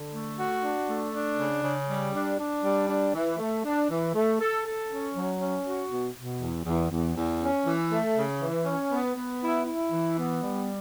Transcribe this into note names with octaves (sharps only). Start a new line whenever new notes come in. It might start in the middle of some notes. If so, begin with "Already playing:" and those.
Already playing: D3
A3
F#4
D4
A3
D4
C#3
C#3
G3
D4
D4
G3
D4
E3
A3
D4
E3
A3
A4
A4
C#4
F#3
C#4
F#4
B2
B2
E2
E2
E2
E2
C#4
E3
A3
C#3
E3
C#4
B3
B3
E4
E4
E3
B3
G3